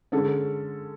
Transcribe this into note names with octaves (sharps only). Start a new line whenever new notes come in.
D3 G#3 C#4 A4